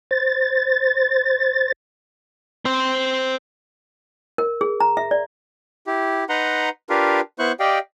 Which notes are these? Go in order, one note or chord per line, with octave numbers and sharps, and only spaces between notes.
C5 A6
C4 C5
A#4
G#4
A#5
E5
D5
E4 G4
D#4 B4 F#5 A#5 C6
D4 F4 G4 A#4 B4 F5
B3 E4 C5 C#6 F#6
G4 D5 D#5 F5 G5